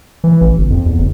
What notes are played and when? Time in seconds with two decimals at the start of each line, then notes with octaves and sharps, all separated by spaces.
0.24 E3
0.41 A1
0.58 G1
0.70 F2
0.86 E2
0.99 F#1